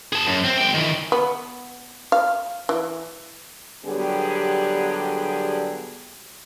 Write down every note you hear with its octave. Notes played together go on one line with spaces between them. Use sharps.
G#4 A5
F#2
C4
G#3 G5
D#3 E3
B3
F5
E3
D3 F#3 G3 B3 G4 G#4